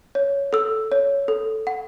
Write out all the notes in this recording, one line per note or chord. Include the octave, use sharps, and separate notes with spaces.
C#5
A4 E6
C#5
A4
F#5